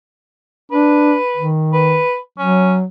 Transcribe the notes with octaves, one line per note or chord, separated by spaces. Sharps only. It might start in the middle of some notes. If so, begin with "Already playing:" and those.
D4 B4
D#3
B4
F#3 C#4